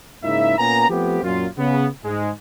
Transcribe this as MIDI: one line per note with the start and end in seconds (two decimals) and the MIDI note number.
0.24 0.55 44
0.24 0.55 49
0.24 0.55 58
0.24 0.55 63
0.24 0.55 64
0.24 0.55 76
0.58 0.87 46
0.58 0.87 58
0.58 0.87 59
0.58 0.87 61
0.58 0.87 80
0.58 0.87 82
0.89 1.22 53
0.89 1.22 57
0.89 1.22 59
0.89 1.22 60
0.89 1.22 67
1.23 1.46 42
1.23 1.46 46
1.23 1.46 65
1.58 1.86 49
1.58 1.86 59
2.04 2.29 44
2.04 2.29 56